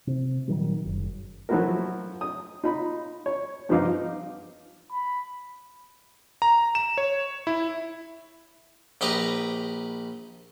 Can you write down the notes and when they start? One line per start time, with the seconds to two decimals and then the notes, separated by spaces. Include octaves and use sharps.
0.07 C3
0.48 A#2 D#3 F#3 G3
0.85 F#1
1.49 F3 F#3 A3 E4 F#4 A#4
2.21 D#6
2.64 D#4 F4 B5
3.26 C#5
3.69 G2 F3 B3 D#4 F5 D6
4.92 B5
6.42 A#5
6.75 E7
6.98 C#5
7.47 E4
9.01 A#1 G4 B4 D#5 A#5